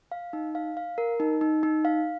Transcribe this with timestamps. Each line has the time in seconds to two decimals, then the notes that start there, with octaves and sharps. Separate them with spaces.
0.12 F5
0.33 D#4
0.55 F5
0.77 F5
0.98 A#4
1.20 D#4
1.41 D#4
1.63 D#4
1.85 F5